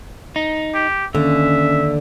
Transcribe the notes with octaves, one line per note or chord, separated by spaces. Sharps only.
D#4
G4
D#2 D3 C#4 E5